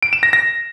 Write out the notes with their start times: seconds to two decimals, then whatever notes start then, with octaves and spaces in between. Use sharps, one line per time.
0.03 D7
0.13 E7
0.23 A#6
0.33 A#6